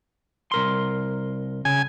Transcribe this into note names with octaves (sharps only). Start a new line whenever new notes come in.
C2 A#4 C6
C#3 G#5